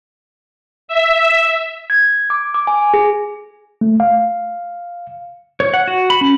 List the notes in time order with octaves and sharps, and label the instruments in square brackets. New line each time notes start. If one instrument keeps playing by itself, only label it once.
[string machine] E5
[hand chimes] G#6
D6
D6
G#5
G#4
[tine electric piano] A3
F5
[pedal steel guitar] C#5
F#5
F#4
B5
C#4